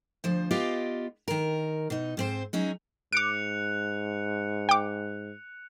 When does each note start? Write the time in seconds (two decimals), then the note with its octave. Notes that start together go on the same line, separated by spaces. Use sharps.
0.24 D2 F3 C5
0.51 B3 F4 G4 D5 D#5 F5
1.28 D#3 A#4
1.90 B2 D#4
2.17 G#2 C4 C5
2.53 F#3 C#4 D#4 G#4
3.13 G#2 D6 F#6 C#7 D7 F7
4.69 G5 D6